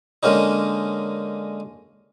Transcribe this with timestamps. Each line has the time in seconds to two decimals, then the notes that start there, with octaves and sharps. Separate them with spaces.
0.23 D3 G#3 A#3 C#4 D#4